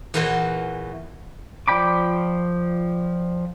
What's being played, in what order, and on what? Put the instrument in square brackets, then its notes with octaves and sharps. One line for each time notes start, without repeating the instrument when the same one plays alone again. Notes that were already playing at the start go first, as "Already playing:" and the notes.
[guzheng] E2 A#2 E3 F#4 C5 C6
[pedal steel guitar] F3 D5 G5 B5 D6